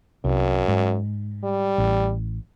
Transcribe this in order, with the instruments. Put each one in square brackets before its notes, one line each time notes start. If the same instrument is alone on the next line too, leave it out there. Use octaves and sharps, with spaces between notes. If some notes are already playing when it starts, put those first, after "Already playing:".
[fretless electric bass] C2 [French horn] F#2
[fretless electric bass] G#2
[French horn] G3
[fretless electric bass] A1